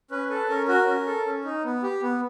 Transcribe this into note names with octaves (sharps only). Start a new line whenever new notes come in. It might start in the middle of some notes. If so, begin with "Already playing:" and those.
C#4 B4
A4 B4
C#4 A#4
F#4 A#4
C#4
A4
C#4
D#4
B3
G4
B3